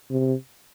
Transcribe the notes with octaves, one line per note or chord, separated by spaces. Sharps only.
C3